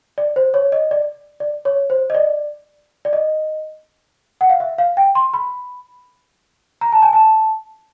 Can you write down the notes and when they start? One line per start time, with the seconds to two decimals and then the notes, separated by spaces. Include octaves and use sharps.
0.18 D5
0.36 C5
0.54 C#5
0.72 D#5
0.91 D5
1.40 D5
1.65 C#5
1.90 C5
2.10 D#5
2.15 D5
3.05 D5
3.13 D#5
4.41 F#5
4.50 F5
4.60 E5
4.78 F5
4.97 G5
5.15 C6
5.34 B5
6.81 A#5
6.92 A5
7.02 G#5
7.13 A5